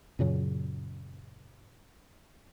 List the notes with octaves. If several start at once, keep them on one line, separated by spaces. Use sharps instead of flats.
F#2 A#2 C#3 F#3